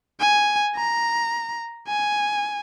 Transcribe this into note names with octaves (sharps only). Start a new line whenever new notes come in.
G#5
A#5
G#5